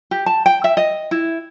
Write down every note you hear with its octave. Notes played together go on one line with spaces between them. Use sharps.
G4
A5
G5
E5
D#5
E4